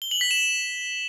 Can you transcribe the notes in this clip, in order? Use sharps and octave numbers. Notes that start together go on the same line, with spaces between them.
G7
F#7
B6
E7